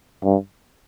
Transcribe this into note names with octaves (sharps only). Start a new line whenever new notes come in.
G2